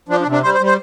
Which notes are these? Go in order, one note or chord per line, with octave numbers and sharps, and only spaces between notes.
F3 D4
D4
C3
D4
G3 C5
C5
G3
C5